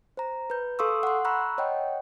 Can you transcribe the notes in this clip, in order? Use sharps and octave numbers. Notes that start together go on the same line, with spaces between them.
C5 A#5
B4 G6
A4 F5 C6 C#6 D#6 E6
F#5 C6
A#5 B5 C#6 E6 F#6
C#5 D#5 F#5 G5